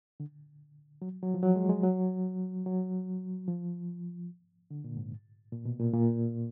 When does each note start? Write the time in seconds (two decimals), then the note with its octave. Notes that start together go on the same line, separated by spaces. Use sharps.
0.20 D3
1.02 F#3
1.23 F#3
1.34 F3
1.43 F#3
1.56 G#3
1.69 G#3
1.83 F#3
2.66 F#3
3.48 F3
4.71 D3
4.84 A#2
4.97 G#2
5.52 A#2
5.65 B2
5.80 A#2
5.93 A#2